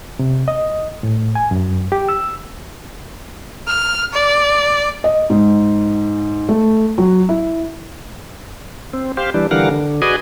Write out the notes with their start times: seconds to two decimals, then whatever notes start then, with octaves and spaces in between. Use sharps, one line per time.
0.19 C3
0.48 D#5
1.03 A2
1.35 G#5
1.51 F#2
1.92 G4
2.09 E6
3.67 F6
4.13 D5
5.04 D#5
5.30 G#2
6.49 A3
6.98 F#3
7.29 E4
8.93 C4
9.17 G4 C5 F5
9.34 E3 G3 D4
9.51 D3 E3 G3 A#4 F5 F#5
9.71 D3
10.02 F#4 G#4 B4 D5 D#5 G#5